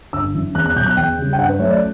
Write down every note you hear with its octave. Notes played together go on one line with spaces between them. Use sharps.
G1 E6
F#2 E3
E2 F#6
F#6
B2 F#3 G6
F#6
E2 G5
C#3 G3
G5
G2 F#5
B4
F#3 A3 C#4 C#5
D5